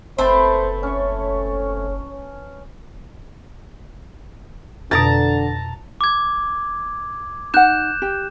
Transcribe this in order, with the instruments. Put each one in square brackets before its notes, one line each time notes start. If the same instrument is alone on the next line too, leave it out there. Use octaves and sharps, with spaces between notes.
[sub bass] F#1 [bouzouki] A3 C4 [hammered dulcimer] B4 A5 [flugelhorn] C5
[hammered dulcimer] C#4 C#6 [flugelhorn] C#5
[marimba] F2 B2 [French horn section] D3 [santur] A5 A#5
[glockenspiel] D6 G#6
[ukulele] D#4 F#5 [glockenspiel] F#6 G6 E7
[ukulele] G4